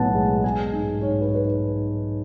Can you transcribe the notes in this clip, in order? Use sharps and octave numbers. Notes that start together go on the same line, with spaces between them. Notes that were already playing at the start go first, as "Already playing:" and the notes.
Already playing: B1 A2 B3 F#5 A5
G#3
G#3 G#5
G#2
G#2 C#5
B4
B4